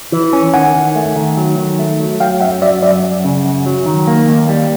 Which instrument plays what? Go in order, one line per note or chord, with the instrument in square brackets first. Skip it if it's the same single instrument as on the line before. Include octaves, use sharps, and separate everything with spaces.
[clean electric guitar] E3
C#4
[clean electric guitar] D#3 [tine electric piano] F#5 G#5
[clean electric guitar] D#3
A3
D#3
F#3
D#3
A3
F#3
[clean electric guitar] F#3 [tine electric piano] F5 G5
[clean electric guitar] F#2 [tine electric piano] E5 F#5
[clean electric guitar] F#3 [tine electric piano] D5 E5
[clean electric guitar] F#2 [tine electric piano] D5 E5
[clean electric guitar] F#2
C#3
F#2
F#3
D#3
A#3
D#2
G3